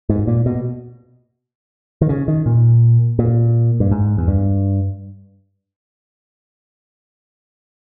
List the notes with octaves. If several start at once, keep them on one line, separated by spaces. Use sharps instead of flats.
G#2
A#2
B2
D#3
C#3
D#3
A#2
A#2
G2
G#2
E2
G2